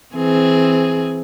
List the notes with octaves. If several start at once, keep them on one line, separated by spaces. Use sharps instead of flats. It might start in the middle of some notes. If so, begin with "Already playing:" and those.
E3 C4 G#4